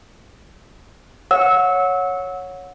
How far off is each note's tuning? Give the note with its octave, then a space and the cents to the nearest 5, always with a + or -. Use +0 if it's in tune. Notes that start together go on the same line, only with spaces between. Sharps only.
C#5 +0 F#5 -25 E6 -25